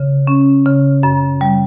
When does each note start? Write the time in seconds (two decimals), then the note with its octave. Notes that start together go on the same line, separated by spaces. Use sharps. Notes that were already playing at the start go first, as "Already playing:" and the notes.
Already playing: C#3
0.27 C#4
0.66 C#3
1.03 F#2
1.41 G3